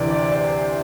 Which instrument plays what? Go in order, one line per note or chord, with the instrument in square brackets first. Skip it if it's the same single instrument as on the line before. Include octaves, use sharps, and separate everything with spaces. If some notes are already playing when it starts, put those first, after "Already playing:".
Already playing: [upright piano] D2 C3 E3 D5
D5
C5